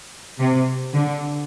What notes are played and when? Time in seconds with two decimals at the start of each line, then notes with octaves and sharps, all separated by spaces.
0.39 C3
0.93 D3